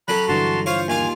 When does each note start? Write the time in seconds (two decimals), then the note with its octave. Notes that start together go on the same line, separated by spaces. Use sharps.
0.08 F#3 C#4 A4 B5 F#6
0.28 G2 D3 E3 F#4 A5 C6
0.66 F4 C5 C#5 F5 C#6
0.88 D#2 F4 F5 G#5